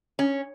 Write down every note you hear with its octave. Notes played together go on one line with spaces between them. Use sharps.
C#4